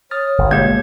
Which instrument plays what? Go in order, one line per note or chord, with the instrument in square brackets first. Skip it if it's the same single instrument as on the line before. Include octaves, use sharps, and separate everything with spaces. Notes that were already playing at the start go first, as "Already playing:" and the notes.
[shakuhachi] C#5 [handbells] D#6 F6 A6
[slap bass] G1
[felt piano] B2 G#3 G6 [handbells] A#3 G4 G#6